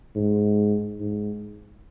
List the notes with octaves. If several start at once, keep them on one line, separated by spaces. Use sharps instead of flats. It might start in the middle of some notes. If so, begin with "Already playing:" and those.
G#2
G#2